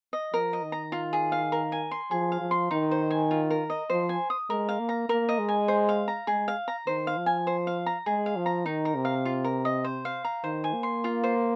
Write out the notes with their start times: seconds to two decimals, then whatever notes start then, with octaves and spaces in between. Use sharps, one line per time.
0.13 D#5
0.33 F3 A#4
0.53 D#5
0.62 D#3
0.72 A#5
0.92 F4
1.13 G#4
1.32 F5
1.52 A#4
1.72 G#5
1.91 C6
2.11 F3 G#4
2.32 F5
2.41 F3
2.51 C6
2.71 D#3 D#4
2.91 C5
3.11 G#5
3.31 F4
3.50 A#4
3.70 D#5
3.90 F3 C5
4.09 G#5
4.30 D#6
4.49 G#3 A#4
4.69 F5
4.79 A#3
4.89 A#5
5.09 A#3 A#4
5.29 D#5
5.39 G#3
5.48 G#5
5.68 C5
5.89 F5
6.08 A#5
6.27 G#3 G#4
6.48 F5
6.68 A#5
6.87 D#3 C5
7.07 F5
7.17 F3
7.26 G#5
7.47 C5
7.67 F5
7.86 A#5
8.06 G#3 G#4
8.26 F5
8.36 F3
8.46 A#5
8.66 D#3 D#4
8.85 A#4
8.96 C3
9.05 F5
9.25 F4
9.44 A#4
9.65 D#5
9.84 C5
10.05 F5
10.24 A#5
10.44 D#3 C5
10.64 G#5
10.74 A#3
10.83 C6
11.04 F4
11.24 C5